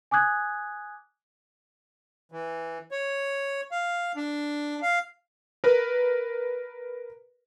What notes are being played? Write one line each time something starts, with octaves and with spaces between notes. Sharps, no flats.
G#5 D6 D#6 F#6 G#6
E3
C#5
F5
D4
F5
A#4 B4